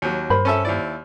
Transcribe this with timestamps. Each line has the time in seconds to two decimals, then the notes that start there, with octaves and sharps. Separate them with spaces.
0.02 D#2 F#3
0.30 G2 A#4 C5 B5
0.45 C#4 A4 E5
0.65 D#2 E4 D5